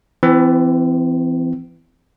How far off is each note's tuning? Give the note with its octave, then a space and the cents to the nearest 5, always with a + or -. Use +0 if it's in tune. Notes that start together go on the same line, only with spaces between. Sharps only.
E3 +20 C4 -25